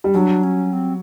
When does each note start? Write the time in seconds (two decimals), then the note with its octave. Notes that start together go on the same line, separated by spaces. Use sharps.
0.04 G3
0.14 F#3 D4
0.43 C#4
0.73 C4